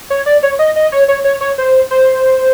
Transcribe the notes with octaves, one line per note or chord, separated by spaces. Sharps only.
C#5
D5
C#5
D#5
D#5
C#5
C#5
C#5
C#5
C5
C5